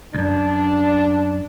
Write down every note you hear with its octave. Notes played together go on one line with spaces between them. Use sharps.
C#2 F#2 D4